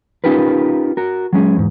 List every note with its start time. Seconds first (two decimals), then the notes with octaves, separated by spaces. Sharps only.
0.24 C#4 D#4 F4 G4 A#4 B4
0.97 F#4 A#4
1.33 F#3 G#3 C#4 G#4
1.56 E2 G#2